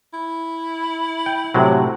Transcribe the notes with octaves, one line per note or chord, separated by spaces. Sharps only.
E4
G5
A2 C3 F#3